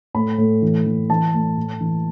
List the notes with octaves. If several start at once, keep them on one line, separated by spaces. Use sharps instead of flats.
A2 B5
A2
E3
E3
E3 A5
A2
A2
E3